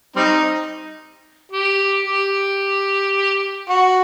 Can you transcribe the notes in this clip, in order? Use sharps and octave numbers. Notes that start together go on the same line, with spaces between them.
G3 C4 D#4
G4
G4
F#4